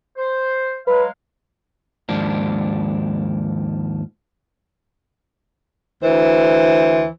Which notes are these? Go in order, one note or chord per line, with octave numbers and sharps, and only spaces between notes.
C5
F#3 G#3 B4 F5
D#2 G#2 F3 D4
D2 E3 C5